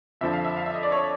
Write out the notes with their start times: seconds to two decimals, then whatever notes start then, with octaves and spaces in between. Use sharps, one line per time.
0.21 F2 D3 F3 E5
0.33 F5
0.45 E5
0.57 F5
0.66 E5
0.74 D#5
0.83 D5
0.92 C#5